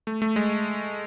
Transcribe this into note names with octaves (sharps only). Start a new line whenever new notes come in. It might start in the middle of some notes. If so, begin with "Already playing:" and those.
A3
A3
G#3